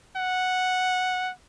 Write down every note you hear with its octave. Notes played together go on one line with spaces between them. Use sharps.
F#5